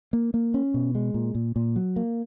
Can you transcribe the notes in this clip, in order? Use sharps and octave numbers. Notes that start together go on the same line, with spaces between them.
A#3
A#3
C#4
B2
G#3
A#2
A#2
A#2
F#3
A#3